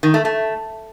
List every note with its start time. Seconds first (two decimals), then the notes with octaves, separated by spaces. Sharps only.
0.03 D#3
0.14 A3
0.25 A3